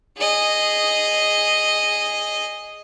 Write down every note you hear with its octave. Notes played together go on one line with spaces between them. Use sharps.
G#4 D#5